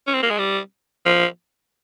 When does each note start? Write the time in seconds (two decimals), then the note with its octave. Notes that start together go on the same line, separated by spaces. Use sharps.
0.07 C#4
0.14 C4
0.23 A#3
0.30 G#3
0.39 G3
1.06 F3